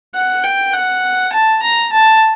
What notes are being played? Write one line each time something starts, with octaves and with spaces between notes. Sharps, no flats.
F#5
G5
F#5
A5
A#5
A5